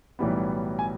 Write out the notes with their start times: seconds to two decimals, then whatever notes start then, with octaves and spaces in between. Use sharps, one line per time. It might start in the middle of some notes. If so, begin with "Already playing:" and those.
0.19 B1 A2 E3 G3 B3
0.79 G#5